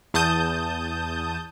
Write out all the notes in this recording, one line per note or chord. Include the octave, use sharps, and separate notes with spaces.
E2 A5 D#6 G6